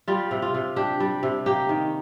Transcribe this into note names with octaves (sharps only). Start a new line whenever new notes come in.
G3 F4
C3
F4
C3
D4 G4
G3
C3
A#3 G4
D#3